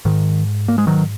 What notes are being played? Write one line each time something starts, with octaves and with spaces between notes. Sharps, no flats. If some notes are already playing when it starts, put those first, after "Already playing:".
G#2 D#3
A#3
G#3
D#3 F#3